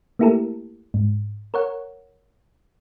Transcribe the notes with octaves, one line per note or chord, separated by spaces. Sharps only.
A3 A#3 E4 G4 A4 A#4
G#2
A#4 C#5 F#5